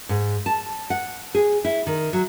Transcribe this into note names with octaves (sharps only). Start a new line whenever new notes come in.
G#2
A5
F#5
G#4
E4
D#3
F#3